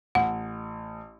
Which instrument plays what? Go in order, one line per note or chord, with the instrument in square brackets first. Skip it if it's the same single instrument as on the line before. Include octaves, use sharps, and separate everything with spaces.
[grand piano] A1 [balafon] F#5